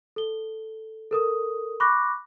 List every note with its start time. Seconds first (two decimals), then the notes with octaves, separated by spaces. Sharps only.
0.16 A4 G7
1.11 A4 A#4 D#6
1.80 B5 C#6 D6 F#6 A#6